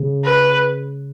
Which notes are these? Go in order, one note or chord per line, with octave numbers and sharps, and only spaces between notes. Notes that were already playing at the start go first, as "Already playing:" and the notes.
Already playing: C#3
B4